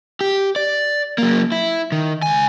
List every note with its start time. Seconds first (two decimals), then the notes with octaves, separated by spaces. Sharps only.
0.21 G4
0.56 D5
1.18 F#3 A#3
1.52 E4
1.92 D#3
2.22 C#2 G#5